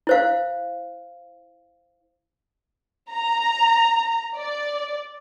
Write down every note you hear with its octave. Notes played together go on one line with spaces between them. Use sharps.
E4 C5 F5
A#5
D5